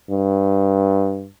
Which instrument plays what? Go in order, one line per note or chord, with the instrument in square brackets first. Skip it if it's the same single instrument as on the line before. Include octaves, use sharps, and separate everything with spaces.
[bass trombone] G2